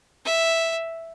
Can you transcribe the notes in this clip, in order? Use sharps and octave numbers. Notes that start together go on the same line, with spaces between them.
E5